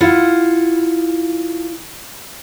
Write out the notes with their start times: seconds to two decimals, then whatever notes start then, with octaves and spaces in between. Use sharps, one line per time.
0.01 E4 F4 F#5